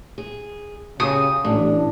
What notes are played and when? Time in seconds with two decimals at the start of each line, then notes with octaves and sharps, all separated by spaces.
0.18 G#4
1.00 C#3 F#4 G4 G#5 D#6
1.45 A1 A2 D4